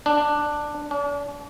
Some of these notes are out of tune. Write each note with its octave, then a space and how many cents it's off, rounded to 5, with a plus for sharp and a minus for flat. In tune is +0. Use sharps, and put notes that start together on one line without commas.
D4 +10
D4 -40